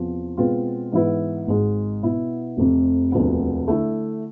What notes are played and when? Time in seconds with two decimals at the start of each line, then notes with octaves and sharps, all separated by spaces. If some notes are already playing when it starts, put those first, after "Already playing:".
Already playing: E2 C3 F3
0.37 B2 G#3 C4 F4 B4
0.92 G#2 E3 B3 E4 B4
1.47 G#1 G#2 G#3
2.03 B2 B3 E4
2.57 F1 F2 C3
3.12 E1 D2 C3 F3 B3
3.67 D3 A3 E4